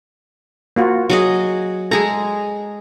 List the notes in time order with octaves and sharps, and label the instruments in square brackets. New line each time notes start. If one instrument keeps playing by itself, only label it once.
[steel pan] A#3 F4 F#4
[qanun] F#3 G#4 D#5
[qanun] G#3 G#4 A#5 [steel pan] A4